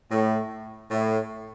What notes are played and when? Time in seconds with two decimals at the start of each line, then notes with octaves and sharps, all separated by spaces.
0.11 A2
0.91 A2